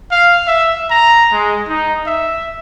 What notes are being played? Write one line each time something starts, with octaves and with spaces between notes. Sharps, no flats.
F5
E5
A#5
G#3
D#4
E5